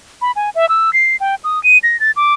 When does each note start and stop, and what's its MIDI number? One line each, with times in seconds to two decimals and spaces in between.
0.22 0.32 83
0.36 0.50 80
0.55 0.68 76
0.69 0.93 88
0.93 1.16 96
1.20 1.35 79
1.44 1.62 87
1.64 1.78 99
1.83 1.99 94
2.00 2.11 93
2.16 2.34 86